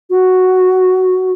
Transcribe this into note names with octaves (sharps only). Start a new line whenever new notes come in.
F#4